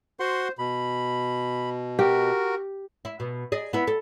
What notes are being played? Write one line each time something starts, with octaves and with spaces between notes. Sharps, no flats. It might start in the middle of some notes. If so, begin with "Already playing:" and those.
F#4 C5 F#5 C6
B2 B5
F#4 G4 A#4
E4
B2
G#4 D5 D#5
B3 E4
A4